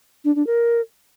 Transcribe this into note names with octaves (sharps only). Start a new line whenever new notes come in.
D4
D4
A#4